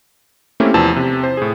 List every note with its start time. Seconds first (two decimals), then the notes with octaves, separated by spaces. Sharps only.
0.60 A3 A#3 C4 C#4 E4 G4
0.74 E2 C3 E3 F3 A5 E6
0.96 C3
1.23 C5
1.37 A2 G#4